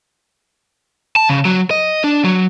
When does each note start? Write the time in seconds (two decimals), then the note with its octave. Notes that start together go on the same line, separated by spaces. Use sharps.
1.16 A5
1.29 C#3
1.45 F#3
1.71 D#5
2.04 D4
2.24 F#3